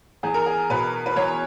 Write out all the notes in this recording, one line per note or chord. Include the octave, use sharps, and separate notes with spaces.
E2 G#4
A#4
G#4
B2 B4
B4
E2 C#5